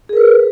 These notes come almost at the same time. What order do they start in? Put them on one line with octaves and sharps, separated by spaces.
G#4 A#4 B4